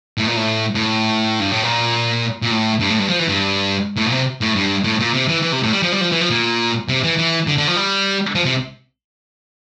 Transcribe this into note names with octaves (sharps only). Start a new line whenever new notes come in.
A2
A#2
A2
A2
G2
A2
A#2
A#2
A2
G2
A2
G2
F3
E3
G2
A2
A#2
C3
A2
G2
A2
A#2
C3
E3
E3
C3
A2
G3
F3
G3
F3
E3
F3
A#2
C3
E3
E3
D3
D3
F3
G3
F3
C3